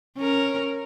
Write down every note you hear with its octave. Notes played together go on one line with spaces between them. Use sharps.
C#4 A#4